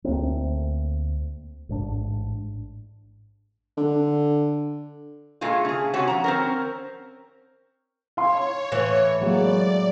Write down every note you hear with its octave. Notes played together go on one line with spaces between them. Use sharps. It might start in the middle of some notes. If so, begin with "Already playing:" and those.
D2 A3 A#3 C4
A1 G#2 D4
D3
A#2 G#3 A3 F4
C#3 G#4
G#2 C3 C#4 F#4
F3 A#5
C4 C#4 A#4
C#5 F5 C6
A2 E3
F#3 G#3 A#3 D5